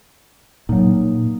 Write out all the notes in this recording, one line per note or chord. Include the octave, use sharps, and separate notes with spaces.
A#2 F#3 D#4